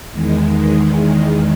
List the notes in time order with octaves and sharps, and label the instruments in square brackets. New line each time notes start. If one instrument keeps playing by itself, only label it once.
[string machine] E2 D#3 G#3